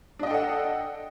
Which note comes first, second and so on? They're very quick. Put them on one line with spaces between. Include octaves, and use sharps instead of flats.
D4 D#5 G5 A4 F#5